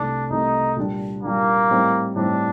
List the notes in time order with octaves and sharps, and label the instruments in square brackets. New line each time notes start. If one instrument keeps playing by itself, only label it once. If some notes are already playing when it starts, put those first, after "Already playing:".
Already playing: [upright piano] C2 C3 D#3 A3 [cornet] D4
[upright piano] C2 C3 D#3 A3 [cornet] D#4
[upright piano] A#2 G3 D4
[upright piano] A#2 G3 D4 [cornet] A#3
[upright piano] A2 G3 C4 D#4
[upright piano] A2 G3 C4 D#4 [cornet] D4